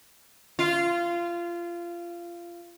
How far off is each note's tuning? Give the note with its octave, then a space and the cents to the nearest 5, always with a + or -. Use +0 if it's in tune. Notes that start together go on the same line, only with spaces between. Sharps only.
F4 -20